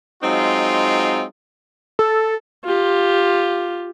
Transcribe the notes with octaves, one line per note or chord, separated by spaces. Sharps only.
F#3 G#3 C4 D#4 F4
A4
F4 G4